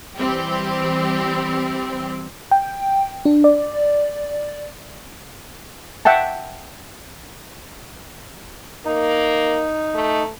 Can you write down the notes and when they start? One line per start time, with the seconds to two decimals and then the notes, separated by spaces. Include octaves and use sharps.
0.16 E3 G3 C4 G4
2.51 G5
3.25 D4
3.44 D5
6.05 E5 F#5 G5 A5
8.85 A#3 D#4
9.95 A3